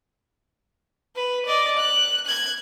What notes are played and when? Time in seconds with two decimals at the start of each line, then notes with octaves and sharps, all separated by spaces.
1.16 B4
1.46 D5 D#5
1.77 F#6
2.26 F#6 G#6